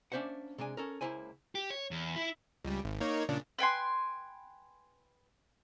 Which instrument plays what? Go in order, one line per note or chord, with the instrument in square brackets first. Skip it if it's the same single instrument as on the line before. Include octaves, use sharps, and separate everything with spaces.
[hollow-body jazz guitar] A#3 C#4 D4 C5 E5 F#5
C3 G#3 D4 G#5
C#4 A4 A#4
C#2 G2 A#3 E4 C5 G#5
[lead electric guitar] G4
C#5
E2
E4
[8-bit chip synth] C#2 G3
G#1
A#3 D#4 C#5
A#2 C#3 D4
[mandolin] B4 G5 G#5 C6